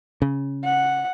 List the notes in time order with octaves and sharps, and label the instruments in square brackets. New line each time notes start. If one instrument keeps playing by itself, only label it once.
[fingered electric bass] C#3
[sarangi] F#5